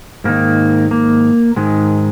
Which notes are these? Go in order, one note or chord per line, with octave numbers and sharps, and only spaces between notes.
G#2 D#3 A#3
A#3
G#2 D#3 G#3